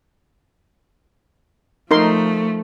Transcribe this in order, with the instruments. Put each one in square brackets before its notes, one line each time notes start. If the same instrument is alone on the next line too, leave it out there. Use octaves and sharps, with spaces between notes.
[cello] F3 A3 [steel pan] D#4 A#4 C6